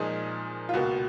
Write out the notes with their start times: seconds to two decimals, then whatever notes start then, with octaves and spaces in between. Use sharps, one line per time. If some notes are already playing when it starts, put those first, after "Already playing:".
Already playing: A#2 F3 G#3 D#4 G#4 A#4
0.69 F4
0.73 C#2 B2 A#3 F#4